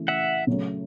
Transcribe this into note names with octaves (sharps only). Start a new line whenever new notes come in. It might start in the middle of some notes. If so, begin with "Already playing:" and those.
Already playing: C#3 E3 A3 E4
E5 F#5
C#3 F#3 A3 C#4